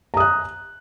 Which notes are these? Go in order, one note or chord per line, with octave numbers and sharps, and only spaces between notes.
A#5 D#6 F#6